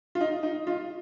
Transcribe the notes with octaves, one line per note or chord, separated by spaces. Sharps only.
F4
D#4
D#4
F4